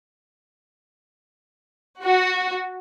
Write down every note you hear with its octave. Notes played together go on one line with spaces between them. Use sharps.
F#4